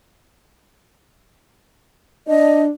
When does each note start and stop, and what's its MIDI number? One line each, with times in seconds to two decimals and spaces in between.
2.28 2.71 62
2.28 2.63 75